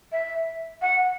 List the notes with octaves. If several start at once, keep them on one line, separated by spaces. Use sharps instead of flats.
E5
F#5